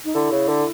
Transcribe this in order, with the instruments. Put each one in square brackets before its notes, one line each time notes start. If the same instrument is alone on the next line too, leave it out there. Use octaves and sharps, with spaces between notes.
[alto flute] D#4
[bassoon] D3 [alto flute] E4
[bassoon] C#3
D3